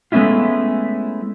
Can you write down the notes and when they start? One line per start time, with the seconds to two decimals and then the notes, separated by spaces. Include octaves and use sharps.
0.12 G#3 A3 B3 C#4 E4 F4